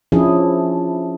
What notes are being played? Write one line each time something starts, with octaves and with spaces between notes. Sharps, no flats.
F3 C#4 D4 E4 G#4